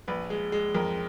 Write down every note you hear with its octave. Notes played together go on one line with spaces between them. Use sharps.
A#1 B4
G#3
G#3
F2 A#4